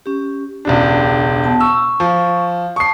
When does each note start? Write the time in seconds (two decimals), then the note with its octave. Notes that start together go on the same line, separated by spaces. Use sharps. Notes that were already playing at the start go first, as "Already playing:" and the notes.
0.06 C#4 G4
0.65 E1 C#2 D4 G4
1.44 B3 A5
1.60 C#6 E6
2.00 F3
2.76 A5 C#6 D#6 C7